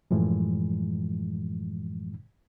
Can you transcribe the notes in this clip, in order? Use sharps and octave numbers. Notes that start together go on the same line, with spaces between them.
F#2 A2 E3 F3 G#3